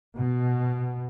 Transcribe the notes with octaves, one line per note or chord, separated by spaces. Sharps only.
B2